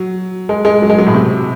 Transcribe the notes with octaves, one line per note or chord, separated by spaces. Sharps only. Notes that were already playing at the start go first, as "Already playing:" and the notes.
Already playing: F#3
G#3
G#3
F#3
G#3
F#3
A2
C3